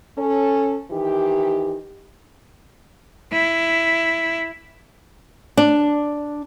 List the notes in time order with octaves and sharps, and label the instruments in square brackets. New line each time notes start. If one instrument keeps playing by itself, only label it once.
[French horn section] C#4 A4
D#3 E3 D#4 G4
[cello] E4
[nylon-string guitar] D4